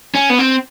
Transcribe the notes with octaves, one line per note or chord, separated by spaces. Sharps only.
C#4
B3
C4